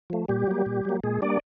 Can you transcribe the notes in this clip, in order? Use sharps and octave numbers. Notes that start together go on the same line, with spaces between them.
F3 A3
A#2 G3 G4
F#3 A#3
A#2
F#3 A#3
A#2 G#3 G#4
G3 A#3 D4 D5